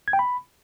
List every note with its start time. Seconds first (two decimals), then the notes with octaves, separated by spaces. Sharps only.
0.08 G#6
0.13 G5
0.19 B5